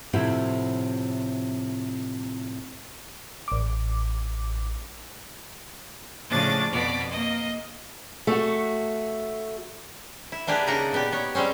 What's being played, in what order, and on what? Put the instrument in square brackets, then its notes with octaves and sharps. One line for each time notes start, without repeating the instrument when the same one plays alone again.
[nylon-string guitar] A2 C3 F3 C4 E4 F#4
[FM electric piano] A1 D6
[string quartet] A2 C#3 F3 D4 D6 A6
F2 B2 B3 D5
A#3 D#5
[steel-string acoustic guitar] A3 F#4
[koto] E4
A#3 D4 G4 G#4 B4
C#3 D4 D#4 A#4 F#5 A#5
A#2 B3 G4
B3 C#5
G3 G#3 C4 C#4